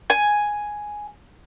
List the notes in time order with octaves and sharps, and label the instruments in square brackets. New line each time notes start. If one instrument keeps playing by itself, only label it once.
[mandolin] G#5